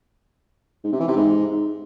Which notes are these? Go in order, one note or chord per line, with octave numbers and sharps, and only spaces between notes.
G#2
C3
E3
C3
G#2